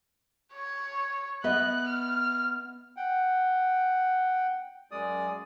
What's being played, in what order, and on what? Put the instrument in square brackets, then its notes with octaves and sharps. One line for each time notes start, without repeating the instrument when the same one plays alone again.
[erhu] C#5
[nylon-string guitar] B3 D#5 E5 [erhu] F#6
[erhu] F6
[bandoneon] F#5 G5
F#2 G#3 D5 D#6